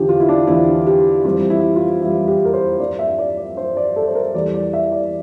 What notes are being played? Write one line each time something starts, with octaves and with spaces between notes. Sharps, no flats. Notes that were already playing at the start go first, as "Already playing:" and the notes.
Already playing: E2 D3 F3 G4
F4
E4
D4
E2 D3 F3 E4
G4
F2 E3 G3 F4
E4
F4
F2 E3 G3 E4
G4
A#4
C5
G2 F3 D5
E5
D5
D5
G2 F3 C5
D5
A4
C5
A#4
E2 E3 G3 D5
D5
E5
D5